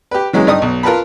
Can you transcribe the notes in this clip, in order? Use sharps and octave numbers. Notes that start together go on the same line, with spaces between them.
G4 B4
E3 F#3 G#3 C#4
G2 D#4 D#6
B1
F4 A#4 B4 A5 B5